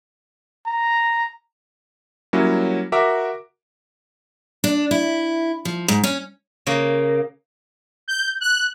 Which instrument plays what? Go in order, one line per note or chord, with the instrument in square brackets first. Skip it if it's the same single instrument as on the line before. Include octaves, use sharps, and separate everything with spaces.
[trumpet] A#5
[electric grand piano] F#3 G3 A#3 C#4 E4
F#4 A#4 E5 A#5 D6
[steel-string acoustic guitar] D4
E4
F3
G#2
C#4
[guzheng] C#3 A#3
[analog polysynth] G6
F#6